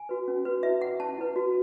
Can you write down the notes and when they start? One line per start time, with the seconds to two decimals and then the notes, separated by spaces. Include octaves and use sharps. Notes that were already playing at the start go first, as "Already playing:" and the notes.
Already playing: G#5
0.09 F#4 B4
0.28 C#4
0.45 F#4 B4
0.63 E4 E5
0.81 B4 F#5
1.00 C#4 A5
1.18 E4 B4
1.36 F#4